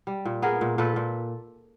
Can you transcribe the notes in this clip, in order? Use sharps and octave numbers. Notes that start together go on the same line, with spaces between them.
G3
A#2
B3 G#4 A#4
A#2
A#2 A4 B4
A#2